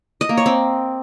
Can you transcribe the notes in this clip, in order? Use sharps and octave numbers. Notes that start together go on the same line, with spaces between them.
D#5
A#3
C#5
C4